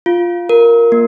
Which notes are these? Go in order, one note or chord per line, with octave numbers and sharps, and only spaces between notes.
F4
A#4
A#3